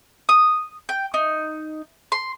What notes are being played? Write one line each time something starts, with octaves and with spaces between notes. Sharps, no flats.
D#6
G5
D#4
C6